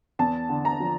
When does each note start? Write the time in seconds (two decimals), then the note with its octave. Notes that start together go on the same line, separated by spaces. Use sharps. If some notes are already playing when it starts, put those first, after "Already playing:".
0.19 E2 A5
0.49 D3
0.65 A#5
0.80 F3